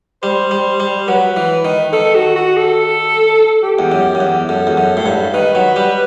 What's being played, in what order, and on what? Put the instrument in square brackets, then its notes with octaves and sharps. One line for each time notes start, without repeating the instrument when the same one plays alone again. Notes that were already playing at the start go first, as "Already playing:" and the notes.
[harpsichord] G3 [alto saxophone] C5
[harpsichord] G3
G3
[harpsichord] F#3 [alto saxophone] B4
[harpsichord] E3
D#3
[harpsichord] D#3 [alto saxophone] A4
[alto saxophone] F#4
F#4
A4
G4
[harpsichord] E2
F#2
F#2
E2
[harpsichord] F#2 [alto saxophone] A4
[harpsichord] E2
F#2
A2
G2
[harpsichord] D#3 [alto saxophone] B4
[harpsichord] F#3
G3